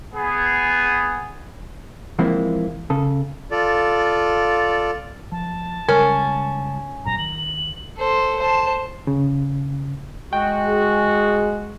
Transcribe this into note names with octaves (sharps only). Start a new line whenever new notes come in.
B3 G#4
E3 F3 G#3 A#3 C4 E4
C#3 A4
F4 A4 D5
F3 A5
C#3 G3 G#3 C#4 A#4
G1 A#2 F#3 A#5
D#3 F#7
A4 C5
C5 A5
C#3
G#3 F#4 G5
G#4